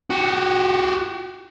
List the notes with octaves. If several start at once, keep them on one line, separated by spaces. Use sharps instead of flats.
F#4 G4